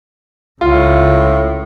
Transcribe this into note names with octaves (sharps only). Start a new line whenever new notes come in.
C#2 A2 F4